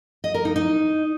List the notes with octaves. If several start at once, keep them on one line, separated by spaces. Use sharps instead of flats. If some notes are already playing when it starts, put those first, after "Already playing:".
D#5
A#4
D#4
D#4